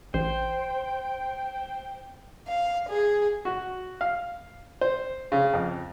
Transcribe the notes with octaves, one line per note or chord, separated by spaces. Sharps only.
A1 C5 G5
F5
G#4
F#4
F5
C5
C#3
F2